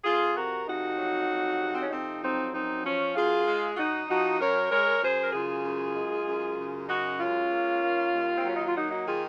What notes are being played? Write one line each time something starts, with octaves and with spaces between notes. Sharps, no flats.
F2 F4 G#4
C3 F#4 A#4
F2 D#4 F#4
F#3
F2
C3
C4
C#4
F2 C4 D#4
F#3 C4 D#4
F#2 C4 D#4
F3 C#4
F#2 F4 G#4
G#3
F4
F#2 D#4 F#4
F3 D#4 F#4
F#2 A#4 C#5
G#3 A#4 C#5
F#2 G#4 C5
A#4
C#3 F4 G#4
F#2
G#3
F#2
C#3
F#2 D#4 F#4
G#3 C#4 F4
A#3
D#3
D#2
C4
F#3 C#4
D#4
F4
A#3 D#4 F#4
D#4 F#4
D#3 F4 G#4